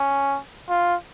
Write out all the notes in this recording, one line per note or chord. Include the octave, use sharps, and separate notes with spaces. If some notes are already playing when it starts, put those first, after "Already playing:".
Already playing: C#4
F4